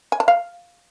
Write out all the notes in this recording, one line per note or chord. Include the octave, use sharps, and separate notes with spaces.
G#5
A5
F5